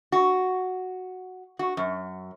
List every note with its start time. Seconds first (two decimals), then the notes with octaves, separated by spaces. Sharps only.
0.12 F#4
1.59 F#4
1.77 F#2